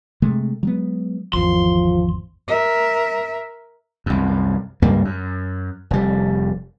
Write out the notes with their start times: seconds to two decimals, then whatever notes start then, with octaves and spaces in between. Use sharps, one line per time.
0.22 C3 G#3 A3
0.63 F#3 G#3 B3
1.33 G#1 E2 F3 C6
2.48 A#4 E5
4.06 C2 F#2
4.82 C#2 G2 G3 A#3
5.05 F#2
5.91 F1 G3